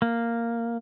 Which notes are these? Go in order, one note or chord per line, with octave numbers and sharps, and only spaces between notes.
A#3